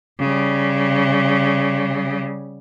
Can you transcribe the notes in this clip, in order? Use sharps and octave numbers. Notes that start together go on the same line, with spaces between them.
C#3 G3